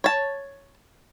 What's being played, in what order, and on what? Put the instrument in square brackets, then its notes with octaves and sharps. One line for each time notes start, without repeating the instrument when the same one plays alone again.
[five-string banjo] C#5 A5